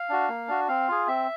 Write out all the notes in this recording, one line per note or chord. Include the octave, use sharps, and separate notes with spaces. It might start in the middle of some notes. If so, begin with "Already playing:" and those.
Already playing: F5
D4 F#4
A#3
D4 F#4
C4 F5
F4 G#4
C4 E5